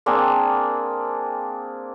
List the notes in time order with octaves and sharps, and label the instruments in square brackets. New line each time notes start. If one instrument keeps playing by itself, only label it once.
[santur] A#3 C4 D4 G#4